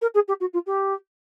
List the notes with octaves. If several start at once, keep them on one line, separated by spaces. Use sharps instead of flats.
A#4
G#4
G4
F#4
F4
G4